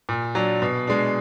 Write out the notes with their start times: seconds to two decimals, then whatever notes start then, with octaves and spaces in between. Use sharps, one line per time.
0.09 A#2
0.35 F#3 D4
0.62 B2
0.87 G#3 D4